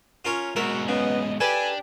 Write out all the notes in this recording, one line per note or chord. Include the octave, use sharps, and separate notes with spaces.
C#4 F4 A#4 C#5
G#2 B2 F#4 A#4 E5
C#3 B3 D#5
D4 G4 A4 B4 G#5